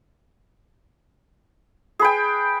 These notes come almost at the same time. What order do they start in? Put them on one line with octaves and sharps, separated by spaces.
G#4 B4 G5